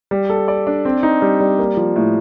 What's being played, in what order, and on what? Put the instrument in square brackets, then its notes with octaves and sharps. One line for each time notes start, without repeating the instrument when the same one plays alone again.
[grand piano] G3
A4
D5
D4
C4
D#4
G3
G3
A#3
F3
A2